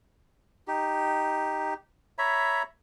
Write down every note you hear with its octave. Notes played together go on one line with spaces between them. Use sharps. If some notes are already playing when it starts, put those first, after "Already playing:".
D#4 G4
C#5 E5 A#5 B5